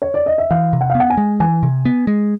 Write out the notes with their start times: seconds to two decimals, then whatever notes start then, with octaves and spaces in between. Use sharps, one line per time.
0.02 C#5
0.14 D5
0.26 D#5
0.38 E5
0.51 E3 F5
0.73 C3
0.81 F#5
0.90 F5
0.95 B3
1.00 F#5
1.10 G#5
1.17 G#3
1.40 E3 G#5
1.63 C3
1.85 B3
2.07 G#3